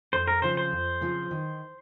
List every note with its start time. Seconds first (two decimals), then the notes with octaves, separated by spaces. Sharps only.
0.13 F2 C5
0.28 A#4
0.42 C#3 F3 C4 F4 C5
0.57 C5
0.72 F2
1.01 C#3 F3 C4 F4
1.31 D#3